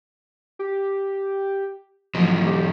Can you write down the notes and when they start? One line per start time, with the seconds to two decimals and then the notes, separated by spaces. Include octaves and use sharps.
0.59 G4
2.15 E2 F3 F#3
2.47 G4